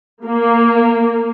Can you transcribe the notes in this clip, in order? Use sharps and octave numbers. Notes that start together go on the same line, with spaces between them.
A#3